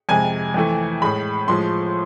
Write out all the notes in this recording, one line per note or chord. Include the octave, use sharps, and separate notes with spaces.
F2 C3 G#3 G#5
F2 E3 A3
A2 G#3 B5
A2 F3 G#3 C6